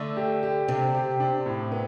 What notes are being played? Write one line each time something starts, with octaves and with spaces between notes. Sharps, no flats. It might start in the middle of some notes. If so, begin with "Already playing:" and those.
Already playing: D3 A3
G4
G4
C3 D4
G4
D4
A2
B3